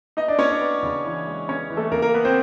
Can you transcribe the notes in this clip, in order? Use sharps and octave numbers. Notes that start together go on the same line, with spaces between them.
B3 D#4 D#5
D4 D5
B3 C#4 C#5
D4 D5
B3
C#3
E3
G#3
B3 C#4 C#5
E3
A3 A4
C#3 A#3 A#4
A#3 A#4
B3 B4
C4 C5